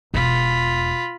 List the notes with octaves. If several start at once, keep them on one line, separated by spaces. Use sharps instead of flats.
E1 F4 B5